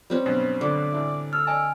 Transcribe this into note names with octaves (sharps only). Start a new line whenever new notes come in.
G3 C4 C#4
G2 B2 F#3
D3 D5
A1 D4 E4
A4 F6
A4 D5 D#5 G#5 A5